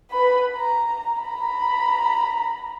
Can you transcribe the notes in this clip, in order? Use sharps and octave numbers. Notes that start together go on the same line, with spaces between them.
B4 B5
A#5
A#5 B5